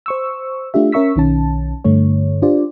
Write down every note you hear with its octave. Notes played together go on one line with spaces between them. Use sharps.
C5 C#6 E6
A3 D4 F4 G4 E5
C#4 A#4 E5 C#6 E6 B6
B1 D#3 C#4 A5
G2 D3 A3 C#5
D4 F4 G4 C5 D5